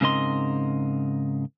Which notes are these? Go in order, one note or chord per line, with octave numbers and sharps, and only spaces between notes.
G#2 C#3 C4 A#4 D#5 C6